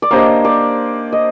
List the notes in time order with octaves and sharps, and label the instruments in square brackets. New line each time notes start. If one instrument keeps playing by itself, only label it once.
[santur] D5
[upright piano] A#3 D4 G4 C5 D#5 [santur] C#5
[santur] D5
D#5